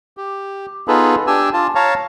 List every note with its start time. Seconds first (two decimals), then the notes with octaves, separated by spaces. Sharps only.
0.17 G4
0.88 B3 D#4 F4 G#4 A4 B4
1.27 D4 G4 G#5 E6
1.53 F4 A5
1.75 C#5 F5 A5 A#5 C#6